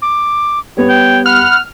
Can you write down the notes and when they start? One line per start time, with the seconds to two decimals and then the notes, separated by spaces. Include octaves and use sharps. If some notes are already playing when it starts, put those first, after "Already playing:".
0.02 D6
0.77 G3 B3 B4 C#5
0.89 G5
1.26 F#5 B5 F6